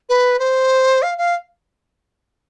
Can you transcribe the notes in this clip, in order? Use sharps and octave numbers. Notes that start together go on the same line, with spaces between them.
B4
C5
F5
F5